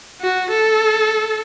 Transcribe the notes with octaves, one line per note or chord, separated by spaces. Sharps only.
F#4
A4